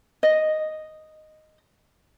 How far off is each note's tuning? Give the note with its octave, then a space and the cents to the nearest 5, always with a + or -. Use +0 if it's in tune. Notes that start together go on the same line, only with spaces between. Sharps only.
D#5 -5